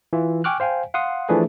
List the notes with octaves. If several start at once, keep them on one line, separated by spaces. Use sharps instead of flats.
E3 F4
G5 G#5 C#6 D6 F6 F#6
C5 F5 G5 G#5
F5 F#5 C6 D#6
E3 F3 A3 D4 G#4 B4